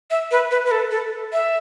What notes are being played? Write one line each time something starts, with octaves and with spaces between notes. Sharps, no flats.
E5
B4
B4
B4
A4
A4
E5